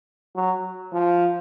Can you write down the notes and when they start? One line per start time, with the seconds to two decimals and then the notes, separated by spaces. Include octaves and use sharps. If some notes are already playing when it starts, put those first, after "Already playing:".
0.36 F#3
0.93 F3